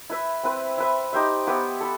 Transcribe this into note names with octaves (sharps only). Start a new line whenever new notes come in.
E4 B4 E5
C4 E4 B4
E4 B4 E5
D#4 G4 C5 E5
B3 E4 G4 B4
E4 A4